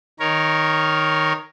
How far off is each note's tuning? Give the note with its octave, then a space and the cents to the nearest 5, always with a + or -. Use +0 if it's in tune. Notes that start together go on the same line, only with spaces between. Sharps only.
D#3 +0 A#4 +0 C#5 +0